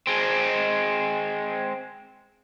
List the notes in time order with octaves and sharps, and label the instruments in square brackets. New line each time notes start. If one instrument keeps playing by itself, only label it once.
[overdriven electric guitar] G#3 C4